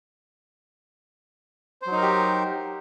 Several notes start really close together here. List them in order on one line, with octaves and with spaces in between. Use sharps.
C5 F#3 D#4 A#4 G4